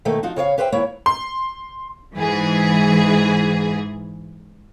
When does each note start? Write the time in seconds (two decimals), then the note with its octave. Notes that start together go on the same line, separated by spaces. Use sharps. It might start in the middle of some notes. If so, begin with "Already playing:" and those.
0.05 B2 D#3 A3 A#3
0.23 F3 D#4 F4 F#4
0.36 C#3 C#5 D5 F5
0.58 G4 B4 C5 E5 G5
0.72 D#2 A#3 E4 C#5
1.06 C6
2.16 G#2 E3 G#4